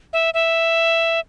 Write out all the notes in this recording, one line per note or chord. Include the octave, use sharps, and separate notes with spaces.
E5
E5